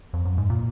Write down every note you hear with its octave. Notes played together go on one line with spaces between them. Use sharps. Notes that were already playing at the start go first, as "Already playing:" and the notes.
F2
F#2
G#2
A#2